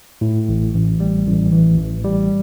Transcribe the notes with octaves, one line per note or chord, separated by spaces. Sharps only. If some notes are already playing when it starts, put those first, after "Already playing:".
A2
A1
A1
G3
A1
E3
A1
G3